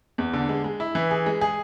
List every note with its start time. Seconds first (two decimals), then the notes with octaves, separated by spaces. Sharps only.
0.18 E2
0.33 D3
0.49 G#3
0.64 G#3
0.80 E4
0.95 E3
1.11 G#4
1.26 G#3
1.41 G#4